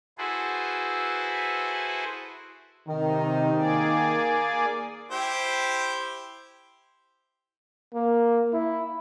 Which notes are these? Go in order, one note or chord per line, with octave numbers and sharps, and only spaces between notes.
E4 F#4 G#4 A4 B4 C5
C3 D#3 D#4
A#3 G#4 D5
E4 G4 C5
A#3
E4